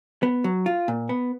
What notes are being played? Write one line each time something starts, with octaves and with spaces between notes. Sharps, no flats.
B3
F#3
F4
A#2
B3